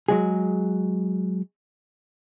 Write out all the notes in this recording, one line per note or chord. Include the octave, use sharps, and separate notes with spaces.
F#3 G#3 G#4